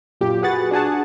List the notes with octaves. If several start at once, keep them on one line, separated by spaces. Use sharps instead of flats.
F#2 A#2 G4
F#4 G#4 B4 F#5 A6
D4 F#4 G#4 F#5 A5